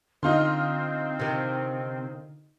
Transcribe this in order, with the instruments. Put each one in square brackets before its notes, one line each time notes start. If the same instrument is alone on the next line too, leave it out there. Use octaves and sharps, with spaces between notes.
[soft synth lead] D3 [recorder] C4 [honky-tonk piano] D#4 F4 C6
[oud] C3 D#3